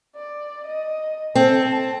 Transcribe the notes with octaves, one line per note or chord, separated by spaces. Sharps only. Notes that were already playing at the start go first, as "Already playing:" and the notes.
D5
D#5
C4 A4
A5